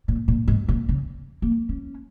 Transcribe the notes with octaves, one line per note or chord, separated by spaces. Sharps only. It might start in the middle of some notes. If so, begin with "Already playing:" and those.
A#2
A#2
G#2
A#2
C#3
A#3
C#4